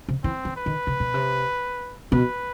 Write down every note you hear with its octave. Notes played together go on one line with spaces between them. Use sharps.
C3
E3 C4
E3
B4
D#3
C3
B2
C3
B2 B4